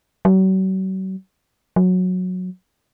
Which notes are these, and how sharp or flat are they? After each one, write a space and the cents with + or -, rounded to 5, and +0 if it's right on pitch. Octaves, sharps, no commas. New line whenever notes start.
F#3 +40
F#3 -15